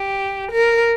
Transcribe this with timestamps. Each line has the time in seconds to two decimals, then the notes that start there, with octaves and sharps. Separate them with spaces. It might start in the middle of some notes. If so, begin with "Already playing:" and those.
Already playing: G4
0.51 A#4